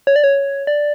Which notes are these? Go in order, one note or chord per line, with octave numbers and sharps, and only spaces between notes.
C#5
D5
C#5
D5